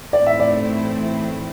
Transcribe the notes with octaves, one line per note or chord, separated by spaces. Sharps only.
A2 E3 A3 C4 E4 D5
E5
D5